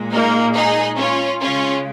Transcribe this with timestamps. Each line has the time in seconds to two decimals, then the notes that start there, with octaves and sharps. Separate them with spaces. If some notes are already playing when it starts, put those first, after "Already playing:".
Already playing: A#2 G#3
0.10 A#3 D#4
0.54 D#4 G#4
0.98 C#4 F4
1.42 C#3 G#3 C#4 F4